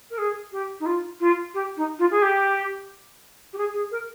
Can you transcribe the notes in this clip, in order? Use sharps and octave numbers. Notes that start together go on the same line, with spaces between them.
A#4
G#4
G4
D#4
F4
F4
G4
D#4
F4
G#4
G4
G4
G#4
G#4
A#4